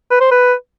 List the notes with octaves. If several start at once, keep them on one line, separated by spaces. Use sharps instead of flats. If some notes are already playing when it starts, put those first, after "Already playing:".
B4
C5
B4